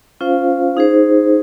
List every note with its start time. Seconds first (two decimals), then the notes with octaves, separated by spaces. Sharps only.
0.20 C#4 F4 C5 F5
0.77 D#4 G#4 C5